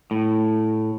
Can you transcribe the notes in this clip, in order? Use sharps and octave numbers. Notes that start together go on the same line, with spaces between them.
A2